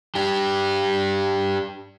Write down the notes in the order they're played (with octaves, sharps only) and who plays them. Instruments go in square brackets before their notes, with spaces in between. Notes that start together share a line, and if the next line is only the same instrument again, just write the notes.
[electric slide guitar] D4 G4